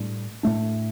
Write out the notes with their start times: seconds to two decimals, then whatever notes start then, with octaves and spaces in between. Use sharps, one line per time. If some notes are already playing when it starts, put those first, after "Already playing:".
Already playing: A2 G3 D4
0.43 A2 A3 D4